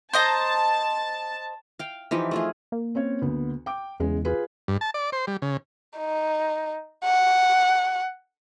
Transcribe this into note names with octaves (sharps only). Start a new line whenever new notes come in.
C5 D#5 A5 A#5
F5 G5
E3 F3 D#4 G4
A3 F4 G#4
A#3
C4 C#4 C#5
D2 B3
G5 D6
E2 C#3 G#3
F4 G#4 B4
G2
A5
D5
C5
G3
C#3
D#4
F#5